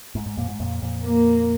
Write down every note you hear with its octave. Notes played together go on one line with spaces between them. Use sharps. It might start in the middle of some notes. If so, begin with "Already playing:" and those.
G#2
G#2
F2 A#2
G#2
F2 A#2
F2 A#2
A#3